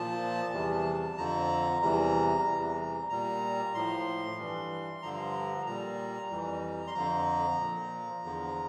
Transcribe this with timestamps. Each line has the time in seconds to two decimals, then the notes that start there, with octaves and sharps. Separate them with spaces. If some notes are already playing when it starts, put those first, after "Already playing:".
Already playing: A#2 F3 A5
0.53 E2 C3 E3 G3
1.18 F2 D3 F3 A#5
1.82 E2 C3 E3 G3 A#5
2.47 E2 C3 E3 G3
3.10 A#2 G3 A#5
3.74 A2 F3 C6
4.38 G2 E3 G3
5.02 G2 D3 F3 A#5
5.66 A#2 G3 A#5
6.31 F2 E3 G3
6.87 C6
6.94 F2 D3 F3 A#5
7.58 A#2 F3
8.23 E2 D3 F3